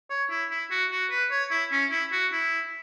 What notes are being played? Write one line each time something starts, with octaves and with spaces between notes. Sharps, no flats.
C#5
E4
E4
F#4
F#4
B4
C#5
E4
C#4
E4
F#4
E4